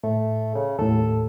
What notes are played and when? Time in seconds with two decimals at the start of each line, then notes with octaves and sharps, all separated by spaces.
0.04 A2 A3
0.55 C#3
0.79 D#2 A2 A4